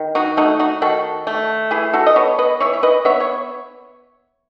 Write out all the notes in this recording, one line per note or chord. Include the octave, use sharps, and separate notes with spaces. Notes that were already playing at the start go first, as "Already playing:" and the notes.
Already playing: D#3
D#4 F#4
A3 D#4 F#4
D#4 F#4
D#3 F#4 A4
A3
E3 E4 G#4
F#4 A4
D#5
B3 A4 C#5
B4 D#5
E3 C#5 E5
E5
B4 D#5
B3 C#5 E5
C#5